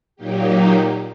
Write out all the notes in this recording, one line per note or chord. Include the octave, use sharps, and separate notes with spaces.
A#2 F#3 A#3 D#4 G4